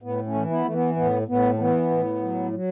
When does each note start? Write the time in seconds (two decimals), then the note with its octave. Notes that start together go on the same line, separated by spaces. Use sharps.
0.02 A2 B3
0.27 A3 C#4
0.35 E3
0.50 B3 E4
0.64 E3 A3
0.74 B3
0.96 A2 B3
1.28 A2 B3
1.53 A3
1.59 E3 B3
1.90 A2
2.22 F#3
2.53 F#3